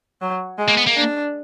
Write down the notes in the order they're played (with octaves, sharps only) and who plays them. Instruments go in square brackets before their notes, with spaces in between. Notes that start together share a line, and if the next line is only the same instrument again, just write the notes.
[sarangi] F#3
G#3
[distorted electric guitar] A#3
B3
A#3
[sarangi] D4